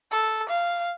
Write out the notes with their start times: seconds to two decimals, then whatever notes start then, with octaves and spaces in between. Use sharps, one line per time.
0.12 A4
0.49 F5